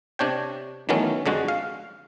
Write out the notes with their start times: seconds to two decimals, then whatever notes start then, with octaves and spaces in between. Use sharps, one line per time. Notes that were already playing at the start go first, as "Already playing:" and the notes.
0.19 C3 D4 C#5 G5
0.89 D#3 E3 F#3 A3 B3 C#4
1.26 F2 D3 G#3 F#4
1.48 F5